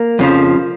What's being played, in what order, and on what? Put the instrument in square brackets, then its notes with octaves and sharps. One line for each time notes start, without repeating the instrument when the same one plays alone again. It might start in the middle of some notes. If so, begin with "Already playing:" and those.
Already playing: [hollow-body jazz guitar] A#3
F2 C#3 F3